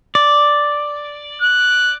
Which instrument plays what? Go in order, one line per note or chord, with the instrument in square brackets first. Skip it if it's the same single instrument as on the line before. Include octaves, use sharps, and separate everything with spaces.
[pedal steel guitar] D5
[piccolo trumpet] F#6